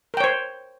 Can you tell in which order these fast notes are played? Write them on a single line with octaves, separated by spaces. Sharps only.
A#4 G5 C#5 C5